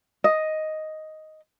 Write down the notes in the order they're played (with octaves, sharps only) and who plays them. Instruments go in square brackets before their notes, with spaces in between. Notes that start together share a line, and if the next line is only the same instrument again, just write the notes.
[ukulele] D#5